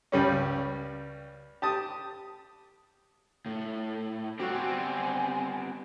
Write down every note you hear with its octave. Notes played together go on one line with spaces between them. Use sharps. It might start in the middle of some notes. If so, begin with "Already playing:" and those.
C#2 G3 C#4
G4 A5 D#6
A2
G3 B3 C4 F#4 G4
G#5